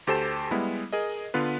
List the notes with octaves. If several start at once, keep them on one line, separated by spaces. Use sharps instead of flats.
D2 G4 A4 C5 A5 E7
G3 G#3 B3 E4
G#4 A#4 D#5
D3 B3 F4 B4